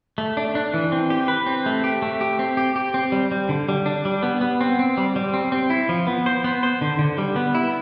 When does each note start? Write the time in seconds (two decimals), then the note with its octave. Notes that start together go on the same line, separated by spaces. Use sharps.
0.18 A3
0.37 D4
0.55 D4
0.74 E3
0.92 C4
1.10 G4
1.28 B4
1.46 C4
1.66 A3
1.84 G4
2.02 A3
2.21 G4
2.39 C4
2.57 G4
2.76 G4
2.94 C4
3.12 G3
3.31 G3
3.49 D3
3.69 G3
3.86 D4
4.05 G3
4.23 B3
4.41 B3
4.61 C4
4.79 C4
4.97 G3
5.16 G3
5.34 C4
5.52 C4
5.70 E4
5.89 F3
6.07 B3
6.26 C5
6.44 B3
6.63 C5
6.81 D3
6.99 D3
7.18 G3
7.36 B3
7.55 E4